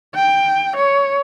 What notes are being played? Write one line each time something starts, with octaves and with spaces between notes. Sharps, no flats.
G5
C#5